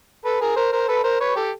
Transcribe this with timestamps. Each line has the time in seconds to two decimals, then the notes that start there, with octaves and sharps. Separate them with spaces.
0.25 A4 B4
0.41 G#4 A#4
0.56 A#4 C5
0.72 A#4 C5
0.88 A4 B4
1.04 A#4 C5
1.20 B4 C#5
1.36 G4 A4